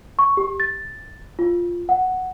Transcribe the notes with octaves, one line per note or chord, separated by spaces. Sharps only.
C#6
G4
A6
F4
F#5